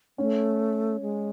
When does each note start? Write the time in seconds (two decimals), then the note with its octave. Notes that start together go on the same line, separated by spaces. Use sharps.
0.18 A3 C#4
1.01 G#3